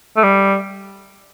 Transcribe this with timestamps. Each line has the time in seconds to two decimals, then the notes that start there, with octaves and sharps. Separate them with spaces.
0.17 A3
0.23 G3